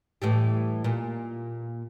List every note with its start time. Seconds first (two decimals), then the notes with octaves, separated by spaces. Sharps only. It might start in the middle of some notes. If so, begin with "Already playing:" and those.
0.22 A2 E3 G3
0.84 A#2